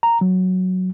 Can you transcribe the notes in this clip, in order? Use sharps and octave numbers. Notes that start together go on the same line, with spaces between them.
A#5
F#3